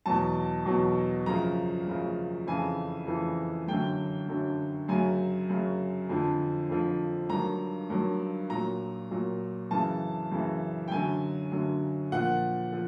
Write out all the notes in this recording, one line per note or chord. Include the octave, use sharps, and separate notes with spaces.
E2 B2 F#3 A5
E2 B2 F#3
F#2 C#3 F3 A#5
F#2 C#3 F3
F2 C#3 E3 G#5
F2 C#3 E3
F#2 D3 F#3 G5
F#2 D3 F#3
F#2 C#3 F#3 G#5
F#2 C#3 F#3
F2 D3 F3
F2 D3 F3
G2 D#3 F#3 A#5
G2 D#3 F#3
A#2 F#3 A#5
A#2 F#3
F#2 C#3 E3 A5
F#2 C#3 E3
G5
F#2 D3 F#3 G#5
F#2 D3 F#3
A#2 F3 F#5
F3